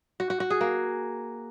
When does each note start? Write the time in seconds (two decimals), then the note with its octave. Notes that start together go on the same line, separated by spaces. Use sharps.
0.20 F#4
0.30 F#4
0.40 F#4
0.50 G#4
0.61 A#3